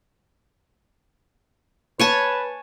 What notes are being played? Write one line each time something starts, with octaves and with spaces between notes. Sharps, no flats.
B4 C#5 G#5 A5